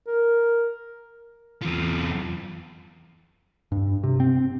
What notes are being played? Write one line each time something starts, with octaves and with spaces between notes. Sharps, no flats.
A#4
E2 F4
G2
C3
C4